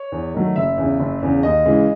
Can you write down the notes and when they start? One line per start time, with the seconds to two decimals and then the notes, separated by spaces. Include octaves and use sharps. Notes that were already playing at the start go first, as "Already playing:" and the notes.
Already playing: C#5
0.12 E2
0.34 D#3 F#3 A3
0.56 F#1 E5
0.78 E2 C#3
0.99 F#1
1.22 E2 C#3
1.43 D#2 D#5
1.65 C#3 E3 G#3